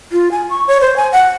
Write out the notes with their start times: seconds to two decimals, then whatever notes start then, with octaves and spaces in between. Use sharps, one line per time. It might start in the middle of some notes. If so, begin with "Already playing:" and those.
0.12 F4
0.32 G#5
0.50 C#6
0.68 C#5
0.81 C5
0.97 G#5
1.12 F#5